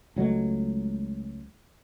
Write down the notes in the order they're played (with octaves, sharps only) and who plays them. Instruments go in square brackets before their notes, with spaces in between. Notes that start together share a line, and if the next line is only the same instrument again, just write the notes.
[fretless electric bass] C#2 F#3 G#3 A3